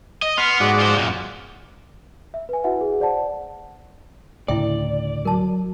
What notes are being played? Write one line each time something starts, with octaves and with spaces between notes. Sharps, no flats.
D#5
B3 C6 F6
G#2 F#4 D5
F4 C5
F#2 A#2
E5
B4 G#5
E4 F#4 B4 E5 F#5
G#4
C5 D5 F#5 A5
D2 A2 C#3 E4 D5 E5 G5
F#3 A#4 A5